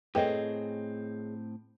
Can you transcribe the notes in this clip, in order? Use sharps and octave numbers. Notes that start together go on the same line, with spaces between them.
A2 C4 G#4 A4 B4 C#5 D#5 G5